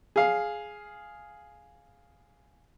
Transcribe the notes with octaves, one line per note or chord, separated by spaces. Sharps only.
G#4 F5